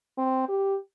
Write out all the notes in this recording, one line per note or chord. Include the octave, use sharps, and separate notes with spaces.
C4
G4